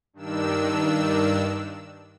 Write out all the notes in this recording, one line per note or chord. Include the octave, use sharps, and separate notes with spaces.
G2 D#3 D4 E6